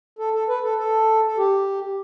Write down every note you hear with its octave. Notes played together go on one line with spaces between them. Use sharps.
A4
A4
B4
A4
A4
A4
G4